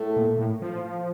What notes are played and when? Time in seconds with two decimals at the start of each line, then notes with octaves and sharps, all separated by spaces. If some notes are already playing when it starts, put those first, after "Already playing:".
Already playing: A2 A3
0.16 A#2
0.39 A2
0.62 F3